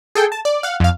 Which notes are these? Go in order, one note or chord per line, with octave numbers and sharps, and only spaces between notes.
G#4 A4 G5
A5
D5
F5 F#5
F2 F5